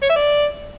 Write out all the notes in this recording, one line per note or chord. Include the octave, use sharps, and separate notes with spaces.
C#5
E5
D5